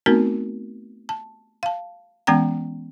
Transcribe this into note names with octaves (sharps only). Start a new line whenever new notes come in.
A3 B3 C4 D#4 F#4 A#4
A5
F5 A5
E3 G#3 B3 C#4 G5 A#5